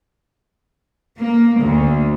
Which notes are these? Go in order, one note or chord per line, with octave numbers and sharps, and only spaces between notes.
A#3
D2